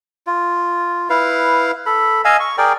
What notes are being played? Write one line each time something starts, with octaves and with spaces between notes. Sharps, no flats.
F4
E4 B4 F5
A4 B5
D#5 F5 G#5 E6
C#6
G#4 A#4 D5 G5